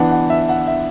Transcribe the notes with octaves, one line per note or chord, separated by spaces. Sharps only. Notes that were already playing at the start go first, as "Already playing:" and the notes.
Already playing: E3 B3 D4 F#5
F#5
E5
F#5
E5